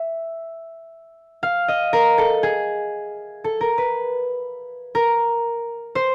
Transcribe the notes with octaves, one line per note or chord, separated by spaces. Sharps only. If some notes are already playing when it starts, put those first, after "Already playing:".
Already playing: E5
F5
D#5
A#4
A4
G#4
A4
A#4
B4
A#4
C5